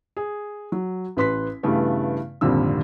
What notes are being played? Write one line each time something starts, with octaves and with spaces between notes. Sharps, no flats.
G#4
F#3
A1 B4 C6 B6
G2 C#3 E3 A3 B3
G#1 F2 A#2 D3 G3 E6